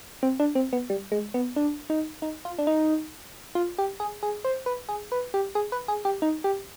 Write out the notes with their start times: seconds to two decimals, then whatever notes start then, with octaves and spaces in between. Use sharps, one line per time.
0.23 C4
0.40 D4
0.55 C4
0.73 B3
0.90 G3
1.12 G#3
1.34 B3
1.56 D4
1.90 D#4
2.22 D#4
2.45 F4
2.58 D4
2.67 D#4
3.55 F4
3.78 G4
4.00 G#4
4.23 G#4
4.44 C5
4.66 B4
4.89 G#4
5.12 B4
5.34 G4
5.55 G#4
5.72 B4
5.88 G#4
6.05 G4
6.22 D#4
6.44 G4